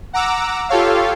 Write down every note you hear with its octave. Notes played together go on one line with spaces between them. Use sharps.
F#5 A#5 D6 E6
F4 G4 A4 C#5 F5